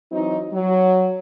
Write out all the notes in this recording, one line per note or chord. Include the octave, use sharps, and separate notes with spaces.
E3 F#3 C4 D#4
F#3